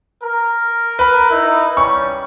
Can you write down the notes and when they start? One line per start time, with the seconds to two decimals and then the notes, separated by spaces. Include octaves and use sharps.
0.23 A#4
0.99 B4 B5
1.31 D#4 E4
1.77 G3 C#4 C#6